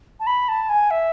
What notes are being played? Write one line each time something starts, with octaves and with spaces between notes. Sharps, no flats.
A5
B5
A5
G#5
E5